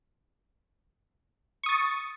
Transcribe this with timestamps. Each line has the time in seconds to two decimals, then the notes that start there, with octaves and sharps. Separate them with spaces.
1.63 C#6
1.66 D#6
1.69 A6